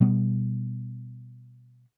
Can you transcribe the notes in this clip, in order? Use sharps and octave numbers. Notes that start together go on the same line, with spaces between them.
B2 G3 B3